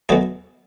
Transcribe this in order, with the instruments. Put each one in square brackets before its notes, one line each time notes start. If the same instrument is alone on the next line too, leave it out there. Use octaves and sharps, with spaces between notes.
[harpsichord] B2 F#3 A3 G#4